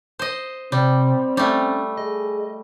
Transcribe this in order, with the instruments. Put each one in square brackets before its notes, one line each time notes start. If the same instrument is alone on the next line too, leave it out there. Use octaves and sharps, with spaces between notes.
[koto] C5 D#5
[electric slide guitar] C3 [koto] G3 [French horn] C4
[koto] G3 A3 [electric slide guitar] C#4
[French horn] G#4 [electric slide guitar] D#5